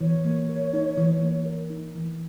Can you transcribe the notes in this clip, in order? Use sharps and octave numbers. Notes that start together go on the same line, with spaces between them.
E3 C#5
A#3
A#4
D#4
E3
A#3
A#4
D#4
E3